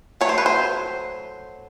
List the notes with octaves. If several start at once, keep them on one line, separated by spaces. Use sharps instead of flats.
F#3 A3 C#5
C5
B4
C5